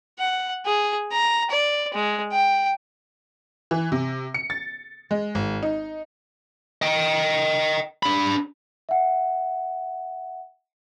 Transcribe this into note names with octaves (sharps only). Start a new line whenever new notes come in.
F#5
G#4
A#5
D5
G#3
G5
E3
C3
C#7
A6
G#3
G#1
D#4
D#5 G5
D4 B5
E5 F#5